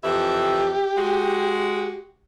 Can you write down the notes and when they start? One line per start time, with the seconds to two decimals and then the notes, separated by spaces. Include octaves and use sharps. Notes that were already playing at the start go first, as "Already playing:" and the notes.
0.03 F2 E3 G4 E5
0.96 G#3 F#4